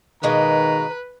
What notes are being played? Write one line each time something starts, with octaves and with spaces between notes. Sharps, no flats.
B2 D#3 G#3 A#3 B4 A#5